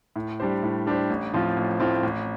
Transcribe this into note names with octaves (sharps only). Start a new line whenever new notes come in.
A2
G3 D4 G4 C5
A2
G3 D4 G4 C5
A1
A2 F3 C4 F4
A1
A2 F3 C4 F4
A1